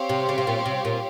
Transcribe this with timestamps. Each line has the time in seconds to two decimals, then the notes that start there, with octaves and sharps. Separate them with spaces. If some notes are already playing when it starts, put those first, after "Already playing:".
Already playing: C4 G4 C#5 F5
0.09 C3
0.29 C#3
0.38 C3
0.47 A#2
0.65 C3
0.85 A#2